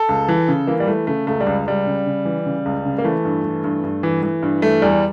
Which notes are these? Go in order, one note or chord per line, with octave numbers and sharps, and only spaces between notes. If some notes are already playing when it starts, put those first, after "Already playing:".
Already playing: A4
C#2
E3
C#3
E3 A#3
G3
E3 A3
C#3 A3
C#2 A3
G3
C#2
C#2 G3
C#3
C#3
E3
C#3
C#2
C#3
A#3
E3 A3
G2
E3
G2
G2
E3
E3
G2
E3 A3
E2 G3